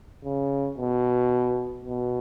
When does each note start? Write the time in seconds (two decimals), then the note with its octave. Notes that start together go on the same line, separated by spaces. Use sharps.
0.24 C#3
0.78 B2
1.85 B2